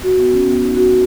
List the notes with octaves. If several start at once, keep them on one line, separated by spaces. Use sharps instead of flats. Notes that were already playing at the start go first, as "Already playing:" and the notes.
F#4
B3
C#4
B3
D#4
F#4